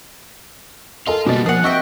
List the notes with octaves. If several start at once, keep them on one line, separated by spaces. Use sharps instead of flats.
A4 A#4 D#5 F5 C6
B2 G3 A#3 D#5 A6
F3 A#3 G#4 F#5
C4 F#4 D#5 E5 G5